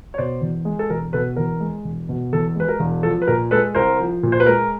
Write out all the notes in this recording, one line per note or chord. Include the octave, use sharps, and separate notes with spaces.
C#5
B2 C5 D5
E2
G#3
A4
E1 A#4
B2 A4 B4
E2 A#4
G#3
E1
B2
E2 A4
G#3 B4
A#4
E1
F3 A4
B4
A#2 A#4
G#3 A4 B4
C2 A#4 C5
F3
A#2
C5
B4
G#3 A#4